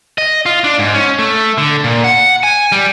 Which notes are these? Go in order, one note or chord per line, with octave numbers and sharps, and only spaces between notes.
D#5
F4
D4
G#2
C#4
A3
D3
A#2
F#5
G#5
G3